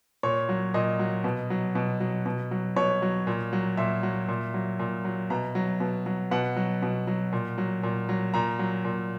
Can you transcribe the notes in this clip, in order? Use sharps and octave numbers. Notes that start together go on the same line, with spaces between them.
A#2 C#5
F#3
A#2 D#5
F#3
B2
F#3
B2
F#3
B2
F#3
B2 C#5
F#3
A#2
F#3
A#2 E5
F#3
A#2
F#3
A#2
F#3
B2 A#5
F#3
B2
F#3
B2 F#5
F#3
B2
F#3
A#2
F#3
A#2
F#3
A#2 A#5
F#3
A#2